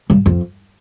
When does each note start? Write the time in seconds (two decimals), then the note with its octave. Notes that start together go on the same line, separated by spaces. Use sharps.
0.10 G2
0.26 F2